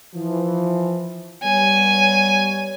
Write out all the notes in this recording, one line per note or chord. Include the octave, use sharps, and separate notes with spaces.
E3 F3
G3 B3 C#5 G#5